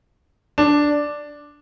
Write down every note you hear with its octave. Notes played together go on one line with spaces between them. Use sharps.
D4